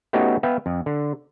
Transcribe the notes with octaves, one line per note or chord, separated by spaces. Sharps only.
A3 B3 C#4 D#4 F#4 G4
B3 B4 E5 F5 G5
F2
D3